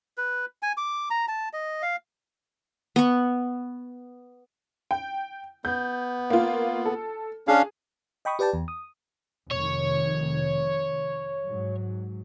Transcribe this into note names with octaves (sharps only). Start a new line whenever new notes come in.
B4
G#5
D6
A#5
A5
D#5
F5
B3 C#6
G5
B3 G6
A#3 F4
A4
C#4 D4 G#4 F5
D#5 G5 B5 C#6 D#6
G4 B4 D5 G5 A5
E2
D#6
F1 D#3 C#5
G#2 F#3